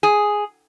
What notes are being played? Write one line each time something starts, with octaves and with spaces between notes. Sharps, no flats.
G#4